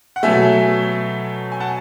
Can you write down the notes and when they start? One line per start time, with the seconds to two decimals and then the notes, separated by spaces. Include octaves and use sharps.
0.16 F#5
0.23 B2 F#3 A3 E5 G#5
1.52 G#5
1.60 F#5 A5